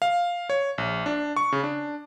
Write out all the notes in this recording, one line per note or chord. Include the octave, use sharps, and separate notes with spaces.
F5
C#5
A#1
D4
C#6
C#3
D4